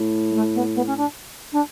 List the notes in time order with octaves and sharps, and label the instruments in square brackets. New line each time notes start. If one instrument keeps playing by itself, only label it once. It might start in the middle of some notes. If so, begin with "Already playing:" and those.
Already playing: [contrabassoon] A2
[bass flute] G#3
A3
B3
B3
C#4
D4
D4